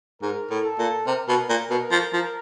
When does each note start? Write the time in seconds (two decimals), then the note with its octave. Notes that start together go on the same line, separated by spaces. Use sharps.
0.22 G#2 A#4
0.50 A2
0.65 A4
0.79 A#2
1.07 C3 A#4
1.28 B2
1.49 A#2 A#4
1.70 B2
1.91 F3
2.13 F3